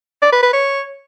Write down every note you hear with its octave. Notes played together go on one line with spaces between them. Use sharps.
D5
B4
B4
C#5